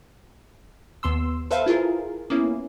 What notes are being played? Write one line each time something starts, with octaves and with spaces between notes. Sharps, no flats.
D#2 B3 C6 E6
A4 B4 C5 E5 F5
E4 F4 G#4 A#4
A#3 B3 C#4 E4